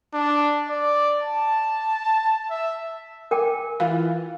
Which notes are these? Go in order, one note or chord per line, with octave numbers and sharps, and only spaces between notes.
D4
D5
A5
E5
A#4 G5 G#5 D6
E3 F4